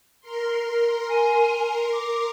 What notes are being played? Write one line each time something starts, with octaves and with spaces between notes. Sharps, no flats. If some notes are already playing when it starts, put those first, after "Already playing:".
A#4 C6
G#5
D6